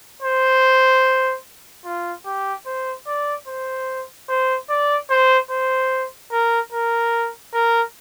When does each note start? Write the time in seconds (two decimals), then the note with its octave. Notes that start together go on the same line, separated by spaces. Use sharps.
0.22 C5
1.85 F4
2.25 G4
2.66 C5
3.07 D5
3.47 C5
4.29 C5
4.69 D5
5.10 C5
5.50 C5
6.31 A#4
6.72 A#4
7.53 A#4